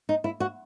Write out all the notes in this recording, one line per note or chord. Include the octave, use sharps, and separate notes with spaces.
D#4
E4
F#4